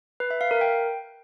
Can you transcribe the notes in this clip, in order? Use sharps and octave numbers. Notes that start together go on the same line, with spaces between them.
B4
E5
F5
A#4
G5